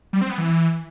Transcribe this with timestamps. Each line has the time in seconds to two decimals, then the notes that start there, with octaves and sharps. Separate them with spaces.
0.13 G3
0.21 C4
0.30 B3
0.38 E3